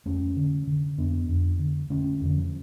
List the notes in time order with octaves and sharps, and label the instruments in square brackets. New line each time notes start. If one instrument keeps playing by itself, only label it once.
[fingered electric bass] F2 A3 C#4
D3
D3
F2 B3 D4
F2
D3
D3 A3 C#4
F2 D3
F3